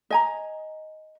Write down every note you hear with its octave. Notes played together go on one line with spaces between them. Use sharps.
D#5 G#5 A#5